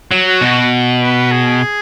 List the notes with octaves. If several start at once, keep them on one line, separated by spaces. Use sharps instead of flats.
F#3
F#4
B2
B4
G#4